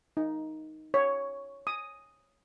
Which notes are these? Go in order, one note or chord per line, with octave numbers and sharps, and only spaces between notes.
D#4
C#5
D#6